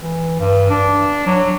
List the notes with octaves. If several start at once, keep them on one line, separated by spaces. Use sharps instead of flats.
E3
G2
D4
F#3